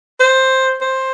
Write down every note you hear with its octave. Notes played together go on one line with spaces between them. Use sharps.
C5
C5